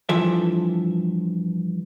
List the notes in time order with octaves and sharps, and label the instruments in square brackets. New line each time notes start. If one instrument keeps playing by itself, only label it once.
[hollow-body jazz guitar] G2 E3 F3 A4 E5